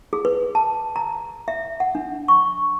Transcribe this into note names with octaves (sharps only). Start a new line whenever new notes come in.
G#4
B4
A5
A#5
E5
F#5
D4
C#6